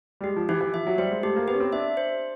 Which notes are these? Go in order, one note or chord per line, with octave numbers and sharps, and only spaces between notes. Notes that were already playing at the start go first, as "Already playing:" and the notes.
G3
G#3 G4
F3
E3 G4
E3
F3 E5
F#3
G3 C5
G#3
A3 G4
A#3
B3 G4
C#4
C4
D4 E5
C5